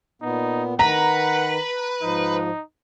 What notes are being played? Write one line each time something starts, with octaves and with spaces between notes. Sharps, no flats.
A#2 B3 D#4
D#3 B4 F#5 A#5
G#2 F3 D#4